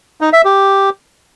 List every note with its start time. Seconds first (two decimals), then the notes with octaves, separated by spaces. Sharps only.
0.21 D#4
0.33 E5
0.45 G4